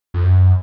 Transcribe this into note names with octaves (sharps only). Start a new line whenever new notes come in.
F2
F#2